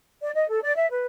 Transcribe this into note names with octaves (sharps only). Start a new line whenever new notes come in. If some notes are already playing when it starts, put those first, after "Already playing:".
D5
D#5
A4
D5
E5
B4